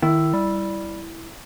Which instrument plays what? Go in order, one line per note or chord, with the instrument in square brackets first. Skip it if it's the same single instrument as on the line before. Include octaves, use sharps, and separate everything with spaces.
[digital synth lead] D#3 [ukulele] E4
[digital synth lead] G3